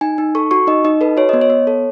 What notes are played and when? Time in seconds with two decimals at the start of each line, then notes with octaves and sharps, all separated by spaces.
0.01 D#4 G#5
0.18 D#4
0.35 A4 C#6
0.51 F#4 C#6
0.67 D#4 D#5
0.84 D#4 D#5
1.01 A4 B4
1.17 F#4 C#5
1.29 B3 D#5
1.41 C#5
1.50 B3
1.67 A4